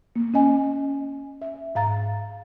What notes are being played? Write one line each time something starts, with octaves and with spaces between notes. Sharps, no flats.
A#3
C#4 D#5 G#5
E5
G#2 F5 A#5 A6